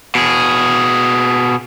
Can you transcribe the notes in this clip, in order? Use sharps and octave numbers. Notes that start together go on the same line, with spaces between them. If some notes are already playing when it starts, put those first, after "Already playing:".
B2 G#4